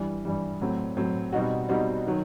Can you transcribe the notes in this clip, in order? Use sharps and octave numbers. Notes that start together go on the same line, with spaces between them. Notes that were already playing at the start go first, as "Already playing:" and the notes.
Already playing: G2 E3 G3
G2 E3 G3
A2 F#3 C4
A2 F#3 C4
B2 G3 C4 D#4 F#4
B2 G3 C4 D#4 F#4
D#3 F#3